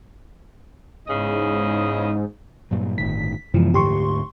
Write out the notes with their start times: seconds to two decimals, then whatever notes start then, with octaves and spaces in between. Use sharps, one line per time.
1.08 E2 G#2 C#3 D#5
2.71 G2 A#2 F#3
2.98 G1 A2 D#3 B6
3.54 F#2 C3 E3 F3 G#3 B3
3.74 D2 G#2 D3 G4 C6 C#6